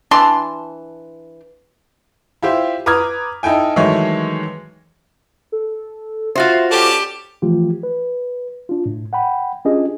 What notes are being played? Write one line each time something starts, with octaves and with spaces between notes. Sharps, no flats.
E3 D4 A5 C6
E4 F4 G4 C5
B4 A#5 D6 D#6 F6 G#6
D#4 E4 A4 G5 G#5
D#3 E3 F#3 G#3 A3 C#5
A4
F4 F#4 C5 E5
C#4 G4 A4 D5 A5
E3 F3 A3 F4 G4
B4
D4 F4
A2
F#5 G5 B5
C#4 D4 F4 G4 G#4 D#5